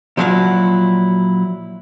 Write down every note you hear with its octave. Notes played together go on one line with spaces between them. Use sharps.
A#2 F3 F#3 E4 F#4 F5